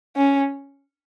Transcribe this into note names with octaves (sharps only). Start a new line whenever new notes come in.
C#4